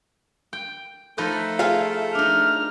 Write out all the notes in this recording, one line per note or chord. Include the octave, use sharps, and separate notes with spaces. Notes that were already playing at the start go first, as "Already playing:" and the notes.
G5
F3 A3 D#4 B4
F4 G#4 F5
D4 D#4 F6